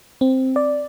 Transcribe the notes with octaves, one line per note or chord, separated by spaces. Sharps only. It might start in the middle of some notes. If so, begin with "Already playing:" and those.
C4
D5